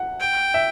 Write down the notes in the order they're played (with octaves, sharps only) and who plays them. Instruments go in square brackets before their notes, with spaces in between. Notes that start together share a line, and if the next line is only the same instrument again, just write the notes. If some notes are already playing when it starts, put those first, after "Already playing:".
Already playing: [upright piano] F#5
[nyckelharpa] G5
[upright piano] E5